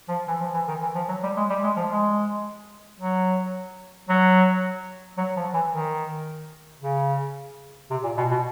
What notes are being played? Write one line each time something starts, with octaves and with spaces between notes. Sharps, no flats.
F3
E3
F3
E3
D#3
E3
F3
F#3
G3
G#3
G3
G#3
F3
G#3
F#3
F#3
F#3
F3
E3
D#3
C#3
C3
A#2
B2
B2